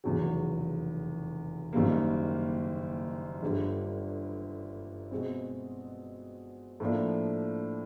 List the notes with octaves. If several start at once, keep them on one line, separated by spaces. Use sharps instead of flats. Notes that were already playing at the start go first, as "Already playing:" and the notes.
F1 E2 C#3 F#3
F#1 F#2 D#3 G3 A#3
G1 G2 D3 G3
B2 G#3 C4
A2 F3 A#3 D4